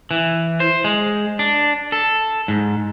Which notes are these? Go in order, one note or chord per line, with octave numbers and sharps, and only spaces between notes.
E3
C5
G#3
D4
A4
G#2